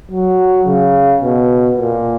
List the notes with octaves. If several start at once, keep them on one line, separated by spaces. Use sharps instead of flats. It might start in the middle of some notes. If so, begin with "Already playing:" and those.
F#3
C#3
B2
A#2